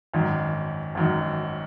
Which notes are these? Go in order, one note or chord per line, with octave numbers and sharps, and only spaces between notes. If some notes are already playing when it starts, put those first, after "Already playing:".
G#1 F#2 D#3
G#1 F#2 D#3